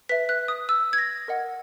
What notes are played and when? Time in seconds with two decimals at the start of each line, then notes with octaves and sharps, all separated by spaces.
0.09 B4 E5 B6
0.29 F#6
0.48 D#6
0.69 E6
0.93 G#6
0.98 A#6
1.28 A#4 D#5 F#5